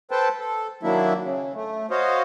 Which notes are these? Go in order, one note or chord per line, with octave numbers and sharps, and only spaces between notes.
A4 B4 C5 G5 A5
A4
D#3 F#3 A#3 D4 E4 E5
C#3
A3
F#4 C5 C#5 D#5 F5